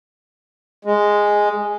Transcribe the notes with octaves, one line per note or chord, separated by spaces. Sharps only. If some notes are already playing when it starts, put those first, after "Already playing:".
G#3